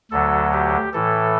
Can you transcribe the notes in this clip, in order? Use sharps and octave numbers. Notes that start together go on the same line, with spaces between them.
D2 D3 F#3 A4
G4
A2 E3 A4